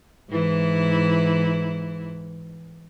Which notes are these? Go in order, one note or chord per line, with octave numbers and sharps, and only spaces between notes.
G#2 E3 E4